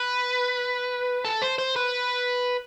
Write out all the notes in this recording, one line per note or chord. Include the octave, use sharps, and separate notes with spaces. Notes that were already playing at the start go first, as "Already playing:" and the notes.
Already playing: B4
A4
C5
C5
B4